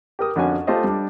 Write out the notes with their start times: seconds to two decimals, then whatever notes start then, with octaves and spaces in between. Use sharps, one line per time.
0.19 G4 A#4 D#6
0.36 F2 D3 C#4 F#4 G#5
0.67 A3 F4 G4 C5 D#5
0.84 G3 D4